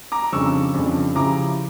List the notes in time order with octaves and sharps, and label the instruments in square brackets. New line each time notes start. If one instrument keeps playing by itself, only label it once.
[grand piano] A#5 D6
[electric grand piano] F2 C#3 G3 D4 [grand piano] C#6 E6
[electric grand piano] F2 C#3 G3 D4
[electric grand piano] C#3 F3 C#4 E4 G4 [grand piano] A#5 D6